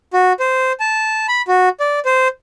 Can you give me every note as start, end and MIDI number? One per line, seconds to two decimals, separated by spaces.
0.13 0.33 66
0.40 0.72 72
0.80 1.26 81
1.28 1.42 83
1.48 1.69 66
1.80 1.99 74
2.05 2.28 72